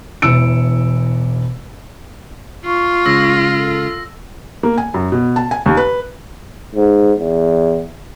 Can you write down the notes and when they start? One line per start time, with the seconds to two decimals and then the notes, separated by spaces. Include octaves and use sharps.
0.22 E1 E3 E6 C#7 D7
2.65 F4 C#6
3.06 C#2 C#3 G#3 E6 A#6
3.55 A4
4.63 A#3
4.78 G#5
4.94 F#2
5.12 B2
5.36 A5
5.51 G#5
5.66 D#2
5.77 B4
6.75 G#2
7.19 E2